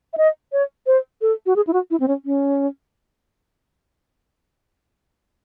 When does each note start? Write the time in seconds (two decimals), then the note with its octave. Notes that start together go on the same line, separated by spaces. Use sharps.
0.13 E5
0.18 D#5
0.52 C#5
0.87 C5
1.22 A4
1.46 F#4
1.56 G#4
1.67 E4
1.73 F#4
1.91 E4
2.00 C4
2.08 C#4
2.25 C#4